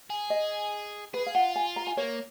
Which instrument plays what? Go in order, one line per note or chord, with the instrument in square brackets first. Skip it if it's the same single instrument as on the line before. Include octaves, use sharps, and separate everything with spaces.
[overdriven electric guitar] G#4
[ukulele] D#5
[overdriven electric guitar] G#4 [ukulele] B4
[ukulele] F5
[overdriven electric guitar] F4 [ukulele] F#5
[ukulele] G#5
A#5
G#5
[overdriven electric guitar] A#3 [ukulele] C#5